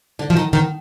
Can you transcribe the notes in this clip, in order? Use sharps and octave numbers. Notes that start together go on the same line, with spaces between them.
D3
F3
D#3
D#3